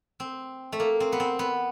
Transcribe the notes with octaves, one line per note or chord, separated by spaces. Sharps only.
C4
A3
A#3
C4
B3
C4
B3